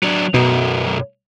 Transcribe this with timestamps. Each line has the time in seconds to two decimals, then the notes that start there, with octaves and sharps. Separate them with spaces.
0.03 F#3 D4
0.34 B1 F#2 B2